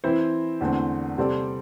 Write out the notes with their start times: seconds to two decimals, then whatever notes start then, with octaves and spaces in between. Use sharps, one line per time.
0.04 E3 C4 E4 C5
0.61 E2 D3 A3 C4
1.17 C3 G3 C4 A4 D5